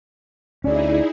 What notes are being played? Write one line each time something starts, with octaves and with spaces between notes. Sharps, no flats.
D2 C#4 D#4 E4 G#4 D5